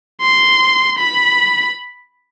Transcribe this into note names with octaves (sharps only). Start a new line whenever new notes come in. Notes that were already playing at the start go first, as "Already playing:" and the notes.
C6
B5